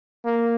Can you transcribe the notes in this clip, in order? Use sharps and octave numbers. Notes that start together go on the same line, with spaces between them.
A#3